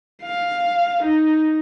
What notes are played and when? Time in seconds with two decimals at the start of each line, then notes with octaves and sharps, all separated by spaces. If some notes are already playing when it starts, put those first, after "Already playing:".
0.23 F5
1.04 D#4